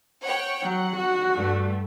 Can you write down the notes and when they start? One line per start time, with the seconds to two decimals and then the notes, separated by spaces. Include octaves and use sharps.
0.24 C#5 F#5 G5
0.63 F#3 F#5
0.96 F#4
1.34 G2 A3